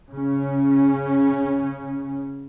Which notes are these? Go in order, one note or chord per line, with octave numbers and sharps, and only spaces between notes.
C#3 C#4